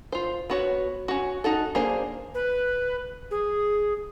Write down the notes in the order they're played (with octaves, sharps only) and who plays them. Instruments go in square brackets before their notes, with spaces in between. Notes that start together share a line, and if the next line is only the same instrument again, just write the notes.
[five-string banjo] F4 C5
B3 F#4 C#5
C#4 F#4
D#4 F#4 A4
A#3 D4 G#4 C5
[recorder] B4
G#4